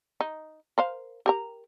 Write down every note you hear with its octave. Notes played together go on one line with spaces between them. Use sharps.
D#4
A#4 C5 F5
G4 A#4 A#5